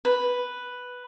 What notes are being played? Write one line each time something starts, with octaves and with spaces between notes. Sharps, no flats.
B4